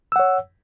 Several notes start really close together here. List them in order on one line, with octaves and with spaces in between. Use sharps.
E6 F#5 C#5